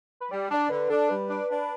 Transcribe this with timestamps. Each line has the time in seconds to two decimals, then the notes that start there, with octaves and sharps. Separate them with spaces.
0.20 B4
0.31 G3 D5
0.50 D4 D5
0.70 D3 B4
0.90 D4 A4
1.09 G3 B4
1.29 D4
1.49 D4